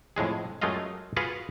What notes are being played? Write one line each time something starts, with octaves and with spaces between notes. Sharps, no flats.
F2 A2 G#3 G#4
F#2 G#3 A3 F4 D#5 F5
F4 F#4 G#4 B4 F5 F#5